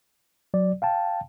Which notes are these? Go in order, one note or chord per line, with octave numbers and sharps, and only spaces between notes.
F#3 D5
F5 G5 A5